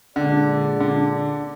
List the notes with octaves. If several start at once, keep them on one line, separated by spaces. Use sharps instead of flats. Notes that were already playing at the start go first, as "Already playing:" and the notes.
A#2 D3 G#3 D4 G#4 D5
D3